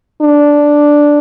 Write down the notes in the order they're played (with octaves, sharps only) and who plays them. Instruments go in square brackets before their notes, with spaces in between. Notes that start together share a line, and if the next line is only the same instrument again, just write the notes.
[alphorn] D4